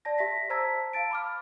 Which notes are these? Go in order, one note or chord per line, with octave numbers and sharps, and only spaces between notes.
D5 A5 A#6
G4 E5 A#6 B6
C5 A5 A#5 E6 G#6 B6
F5 A5 A6 D7
B5 D6 F6